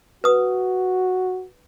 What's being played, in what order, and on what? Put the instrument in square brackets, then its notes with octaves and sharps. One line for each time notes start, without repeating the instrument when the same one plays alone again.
[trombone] F#4 [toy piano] B4 D#6